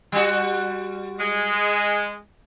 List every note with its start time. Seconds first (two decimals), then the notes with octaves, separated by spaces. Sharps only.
0.12 G3 F#4
1.20 G#3